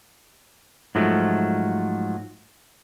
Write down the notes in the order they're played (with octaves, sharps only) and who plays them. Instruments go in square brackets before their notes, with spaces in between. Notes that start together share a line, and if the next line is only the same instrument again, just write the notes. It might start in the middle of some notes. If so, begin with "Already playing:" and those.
[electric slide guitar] G#2 F3 F#3 A3